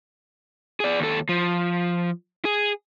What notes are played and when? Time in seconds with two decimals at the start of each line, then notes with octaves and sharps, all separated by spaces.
0.80 G#4 D5
1.00 D#2 A4
1.29 F3
2.45 G#4